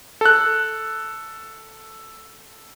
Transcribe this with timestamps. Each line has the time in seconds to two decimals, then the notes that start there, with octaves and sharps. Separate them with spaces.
0.21 A4 F#6